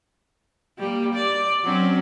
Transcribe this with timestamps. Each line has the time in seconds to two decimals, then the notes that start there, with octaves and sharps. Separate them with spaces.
0.79 G3 A#3
1.14 D5
1.64 F#3 C4 C#4